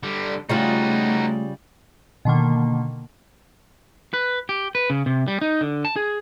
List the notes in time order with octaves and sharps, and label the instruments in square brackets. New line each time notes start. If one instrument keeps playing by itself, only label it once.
[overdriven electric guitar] D3 G3
[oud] C#3 G3 F4 [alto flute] A3 [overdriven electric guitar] D#4 F#4
[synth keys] B2 D3 D#3 A#3
[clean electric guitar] B4
G4
B4
C#3
C3
G3
D#4
D3
A5
G#4